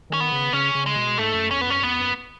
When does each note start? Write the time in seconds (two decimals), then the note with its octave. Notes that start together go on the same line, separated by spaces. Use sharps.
0.10 D#3 C#4
0.20 B3
0.32 C#3
0.53 C#3 C#4
0.75 C#3
0.86 G#3
0.96 B2
1.18 G#2 A3
1.34 F#2
1.51 E2 C#4
1.61 B3
1.67 F#2 C#4
1.83 E2 B3
2.00 F#2